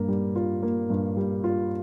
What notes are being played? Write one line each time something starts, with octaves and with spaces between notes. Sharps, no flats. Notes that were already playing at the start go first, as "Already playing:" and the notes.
Already playing: G2 A#3
G3
F4
A#3
G2
G3
F4